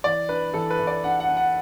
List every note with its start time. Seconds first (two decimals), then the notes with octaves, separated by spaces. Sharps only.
0.04 E3 D5
0.29 D4 B4
0.54 E3 A4
0.70 B4
0.79 E3
0.87 D5
1.04 D4 F#5
1.20 F#5
1.29 D4
1.37 F#5